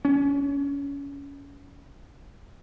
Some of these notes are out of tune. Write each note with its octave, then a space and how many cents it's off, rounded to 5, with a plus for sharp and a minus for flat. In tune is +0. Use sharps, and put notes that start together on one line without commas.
C#4 +20